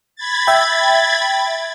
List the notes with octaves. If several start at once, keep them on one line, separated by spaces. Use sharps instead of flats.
B5 G#6 A6
E5 G5